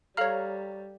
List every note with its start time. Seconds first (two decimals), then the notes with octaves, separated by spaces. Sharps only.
0.17 G3 A4 C#5 F5 A#5 F6